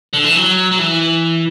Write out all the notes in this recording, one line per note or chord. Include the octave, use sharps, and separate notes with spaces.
D3
E3
F#3
F#3
E3